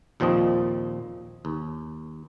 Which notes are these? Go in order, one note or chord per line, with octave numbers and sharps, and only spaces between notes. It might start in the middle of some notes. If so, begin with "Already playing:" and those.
D#2 A#2 F3 C4 D#5
D#2